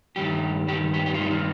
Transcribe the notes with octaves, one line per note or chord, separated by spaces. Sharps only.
G2 D#3 G3 G4
G2 D#3 G3 G4
G4
G4
F4
G2 D#3 G3 D#4
F4